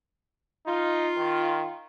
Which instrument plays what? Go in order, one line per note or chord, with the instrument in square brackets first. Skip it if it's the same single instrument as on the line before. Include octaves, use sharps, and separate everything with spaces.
[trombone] D#4 [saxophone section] F4
[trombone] D#3